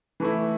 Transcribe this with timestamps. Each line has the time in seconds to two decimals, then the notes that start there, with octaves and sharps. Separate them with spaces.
0.20 E3 A3 E4